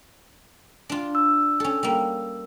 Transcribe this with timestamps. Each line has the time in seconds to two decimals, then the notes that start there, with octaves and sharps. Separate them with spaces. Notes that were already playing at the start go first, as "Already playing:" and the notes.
0.89 D4 F4
1.15 E6
1.60 C#4 A4
1.83 G3 A#3